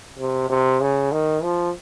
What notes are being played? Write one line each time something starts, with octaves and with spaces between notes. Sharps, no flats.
C3
C3
C#3
D#3
F3